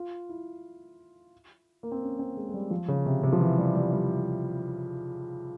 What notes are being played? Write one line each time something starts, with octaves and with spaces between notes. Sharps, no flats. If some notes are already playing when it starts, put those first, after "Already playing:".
Already playing: F4
E4
A#3
C4
C#4
C4
G#3
G#3
G3
F3
C#3
C3
C3
F3
E3
G3
G3
G3